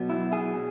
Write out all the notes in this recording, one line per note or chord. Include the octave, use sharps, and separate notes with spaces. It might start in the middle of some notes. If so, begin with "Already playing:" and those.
Already playing: B2 F#3 B3
E4
G#4
B2